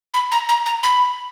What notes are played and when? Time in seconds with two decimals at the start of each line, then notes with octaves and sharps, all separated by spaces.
0.14 B5
0.32 A#5
0.49 A#5
0.66 A#5
0.83 B5